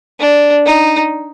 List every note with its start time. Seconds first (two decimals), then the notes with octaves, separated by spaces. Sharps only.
0.20 D4
0.66 D#4